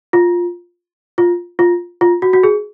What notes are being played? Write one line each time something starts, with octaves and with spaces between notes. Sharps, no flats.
F4
F4
F4
F4
F#4
F#4
G#4